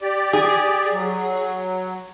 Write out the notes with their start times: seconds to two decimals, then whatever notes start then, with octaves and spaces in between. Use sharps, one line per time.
0.02 G4 D5
0.33 G#4
0.92 F#3